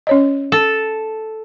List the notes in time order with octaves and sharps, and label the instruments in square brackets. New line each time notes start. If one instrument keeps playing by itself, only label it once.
[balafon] C#4 C#5 D#5
[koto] A4